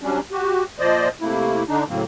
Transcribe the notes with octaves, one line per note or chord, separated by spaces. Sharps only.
C3 F#3 G3 C#4 D4
F#4 G4
A#2 F3 C5 D5 D#5
C3 A3 A#3 E4
D3 D4 D#4
A2 C#3 F#3 A#3 C4